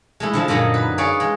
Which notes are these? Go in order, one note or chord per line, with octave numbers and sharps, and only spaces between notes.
G#3 A3 E4
D3 F3 G#3
F#2 A#2 D3 F#3 D#4
B4
G#4 C#5 D5 F5
G#3